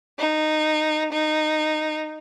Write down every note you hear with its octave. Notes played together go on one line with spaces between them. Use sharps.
D#4
D#4